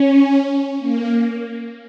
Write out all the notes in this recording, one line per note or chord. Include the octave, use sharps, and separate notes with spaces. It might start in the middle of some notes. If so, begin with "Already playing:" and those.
Already playing: C#4
A#3